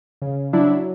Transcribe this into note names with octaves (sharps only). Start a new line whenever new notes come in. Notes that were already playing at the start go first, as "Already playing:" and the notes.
C#3
F#3 D4 E4